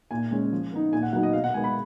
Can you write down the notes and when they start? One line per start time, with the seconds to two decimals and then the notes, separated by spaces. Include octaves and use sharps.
0.11 A#2 G#5
0.31 G#3 C#4
0.52 F3
0.72 B3 D#4
0.93 A#2 G#5
1.03 F#5
1.13 F#3 B3 D#4 F#5
1.23 D#5
1.33 B2 F5
1.44 F#5
1.54 G#3 B3 G#5
1.64 B5